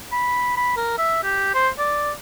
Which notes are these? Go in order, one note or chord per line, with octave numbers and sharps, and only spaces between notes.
B5
B5
A#4
E5
G4
C5
D5